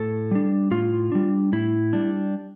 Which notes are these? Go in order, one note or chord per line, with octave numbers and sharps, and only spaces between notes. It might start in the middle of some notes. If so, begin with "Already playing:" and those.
Already playing: A2 A4
G3 D4
A2 F4
G3 D4
A2 E4
G3 D4